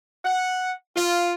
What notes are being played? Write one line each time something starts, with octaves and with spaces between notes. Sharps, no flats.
F#5
F4